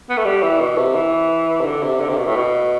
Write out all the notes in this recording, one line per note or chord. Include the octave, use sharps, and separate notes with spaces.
B3
A3
G3
E3
B2
C3
E3
C3
D3
C3
D3
C3
B2
A2
B2